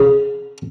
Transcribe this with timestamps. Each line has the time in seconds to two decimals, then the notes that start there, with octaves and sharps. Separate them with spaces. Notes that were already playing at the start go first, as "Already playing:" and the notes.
Already playing: C#3